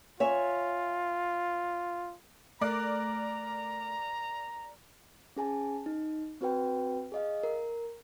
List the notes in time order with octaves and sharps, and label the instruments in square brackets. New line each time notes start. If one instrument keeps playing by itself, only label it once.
[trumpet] F4 [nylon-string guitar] C#5 E5 G#5
[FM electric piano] A3 [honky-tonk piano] A#4 D5 F#6 [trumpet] A#5
[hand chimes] C#4 G#4 G#5 A5
D#4
C4 F#4 B4 G5
G#4 D#5 F5
A#4